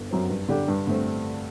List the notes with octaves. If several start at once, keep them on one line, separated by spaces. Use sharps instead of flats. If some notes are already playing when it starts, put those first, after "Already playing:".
Already playing: G1
F#2 F#3 C4
G2
D3 G3 D4 G4
G2
D3 A3 C4